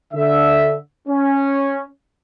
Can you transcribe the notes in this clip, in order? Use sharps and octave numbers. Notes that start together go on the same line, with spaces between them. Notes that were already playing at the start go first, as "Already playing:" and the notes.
D3 E5
C#4